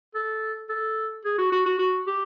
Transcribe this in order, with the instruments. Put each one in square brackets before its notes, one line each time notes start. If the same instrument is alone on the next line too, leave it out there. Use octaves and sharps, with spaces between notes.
[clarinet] A4
A4
G#4
F#4
F#4
F#4
F#4
G4